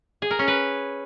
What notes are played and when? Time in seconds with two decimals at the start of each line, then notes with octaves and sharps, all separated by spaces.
0.22 G#4
0.31 A#4
0.39 C#4
0.48 B4